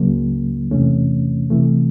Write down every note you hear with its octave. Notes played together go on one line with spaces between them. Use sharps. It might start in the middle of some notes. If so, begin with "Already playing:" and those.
Already playing: C#2 C#3 F#3 A#3
E2 C3 E3 A3 C#4
C3 E3 A3